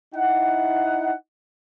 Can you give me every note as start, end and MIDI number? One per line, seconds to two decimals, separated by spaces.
0.14 1.12 63
0.14 1.12 64
0.14 1.12 78